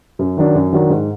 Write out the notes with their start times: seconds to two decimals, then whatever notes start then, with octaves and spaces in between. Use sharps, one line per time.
0.19 F#2
0.37 D#3 F#3 D4
0.55 F#2
0.73 D#3 F#3 D4
0.90 G#2